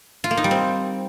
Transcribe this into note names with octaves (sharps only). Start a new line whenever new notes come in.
F4
A#3
D#4
G3
C4